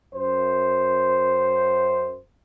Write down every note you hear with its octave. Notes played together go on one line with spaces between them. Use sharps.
F#2 C5